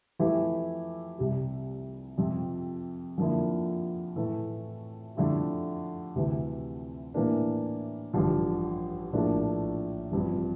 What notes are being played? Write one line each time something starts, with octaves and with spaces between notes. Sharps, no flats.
F2 E3 A3 E4 G4
C2 C3 G3
F2 C3 F3 C4
F2 D3 F3 A#3 E4
A2 E3 A3
F2 D3 A3 E4 G4
D2 C3 E3
A2 E3 A#3 D4
A1 G2 D3 F3
A#1 A2 F3 A#3 D4
A1 G2 F3 C4